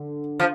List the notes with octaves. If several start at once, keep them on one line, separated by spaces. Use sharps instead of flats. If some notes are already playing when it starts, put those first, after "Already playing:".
Already playing: D3
F3